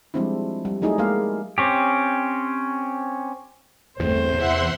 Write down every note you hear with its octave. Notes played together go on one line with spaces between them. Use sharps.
F3 G3 G#3 C4 D4 E4
G3
F#3 A3 D#4 E4 G#4
G#3 A#3 G4 F5
C4 C#4 G4
G1 E2 A3 C4 C5
C3 E3 B3 E5 F#5 C6